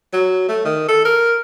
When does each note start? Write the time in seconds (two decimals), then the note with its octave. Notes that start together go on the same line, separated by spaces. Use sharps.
0.13 F#3
0.48 A3
0.65 D#3
0.89 A4
1.05 A#4